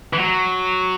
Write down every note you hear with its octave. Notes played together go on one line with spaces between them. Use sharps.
E3
F#3